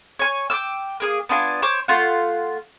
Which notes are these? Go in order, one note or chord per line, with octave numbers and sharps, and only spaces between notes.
C#5 G#5 C#6
G5 D6 E6
A#3 G#4 D#6
B3 D4 F4 G#5
C5 C#5 C#6 D6
A3 F4 F#5